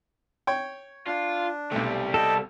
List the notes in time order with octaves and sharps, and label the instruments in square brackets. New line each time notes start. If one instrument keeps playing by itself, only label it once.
[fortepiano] C#5 G5
[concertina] D4 [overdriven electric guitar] F4
[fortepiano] B1 A3 [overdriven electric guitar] C3 G3
[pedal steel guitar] A4 [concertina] D#5 G5